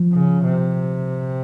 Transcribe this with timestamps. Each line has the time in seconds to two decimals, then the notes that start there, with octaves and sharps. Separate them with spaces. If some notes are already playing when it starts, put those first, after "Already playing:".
Already playing: F3
0.12 C#3
0.44 C3